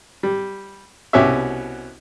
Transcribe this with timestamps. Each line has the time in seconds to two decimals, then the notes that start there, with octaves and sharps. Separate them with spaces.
0.23 G3
1.13 C2 B2 C#4 F#4 G4 E5